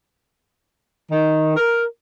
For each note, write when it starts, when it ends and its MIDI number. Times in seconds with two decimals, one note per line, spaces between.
1.11 1.53 51
1.57 1.85 70